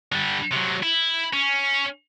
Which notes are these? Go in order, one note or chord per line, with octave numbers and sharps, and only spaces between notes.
D3 G3
C3 F#3
E4
C#4